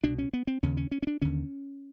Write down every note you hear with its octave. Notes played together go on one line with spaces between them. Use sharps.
C2 B2 D4
C#4
B3
C4
D#2 C#3 C#4
C#4
C#4
C#4
D4
D#2 D3 C#4